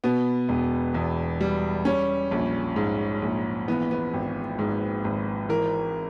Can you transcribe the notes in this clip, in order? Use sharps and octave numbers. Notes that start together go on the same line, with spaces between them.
B2 B3
E1
E2
G3
G3 C#4
A#1
G#2
A#1
E3 B3
B3
G#1
G#2
G#1
E3 A#4